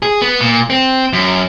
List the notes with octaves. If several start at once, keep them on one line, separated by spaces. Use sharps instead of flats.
G#4
B3
A#2
C4
F#2